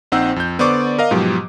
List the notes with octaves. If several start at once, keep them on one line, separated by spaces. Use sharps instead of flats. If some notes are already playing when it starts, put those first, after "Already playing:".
A#1 C4 D#4 C5 F#5 E6
F2 G6
D3 B3 C5 D5 C#6 D6
A#4 D#5 F5
G#2 B2 F3 F#3 G4